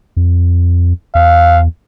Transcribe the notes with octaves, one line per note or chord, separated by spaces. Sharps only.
F2
E2 F5